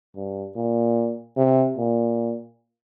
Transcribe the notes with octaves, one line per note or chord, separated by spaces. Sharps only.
G2
A#2
C3
A#2